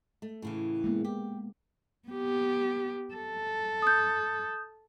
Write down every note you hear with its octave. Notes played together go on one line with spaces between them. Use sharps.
A3
A2 C#3 E3
G#3 A#3 B3
G4
B3 G4
A4
D#6 G6